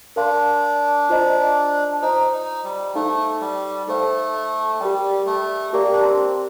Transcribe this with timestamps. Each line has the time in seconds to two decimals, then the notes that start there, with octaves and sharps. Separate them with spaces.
0.16 D4 A#4 F5 C6
1.10 F4 C5 D#5 A#5
2.02 D#4 F4 C5 D#5 A#5
2.33 D#4
2.64 G3
2.95 A3 D#4 A4 C5 F5 A5
3.41 G3
3.87 A3 D#4 A4 C5 F5 A5
4.80 G3 G4 A#4 D5 G5
5.26 A3
5.73 A#3 G4 A#4 D5 G5
5.93 D4
6.04 C4